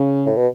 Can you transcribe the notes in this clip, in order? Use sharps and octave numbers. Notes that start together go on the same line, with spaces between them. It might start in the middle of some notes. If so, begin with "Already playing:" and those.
Already playing: C#3
A2
B2